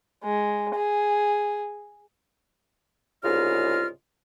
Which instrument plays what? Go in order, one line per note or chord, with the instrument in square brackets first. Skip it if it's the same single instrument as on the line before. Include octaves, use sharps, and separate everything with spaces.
[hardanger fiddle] G#3
G#4
[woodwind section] C2 G#2 C#3 F4 D#5 F6